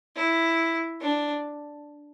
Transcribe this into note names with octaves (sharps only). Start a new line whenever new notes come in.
E4
D4